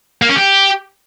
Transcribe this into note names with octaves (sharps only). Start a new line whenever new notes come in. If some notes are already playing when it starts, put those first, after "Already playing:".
A#3
C#4
G4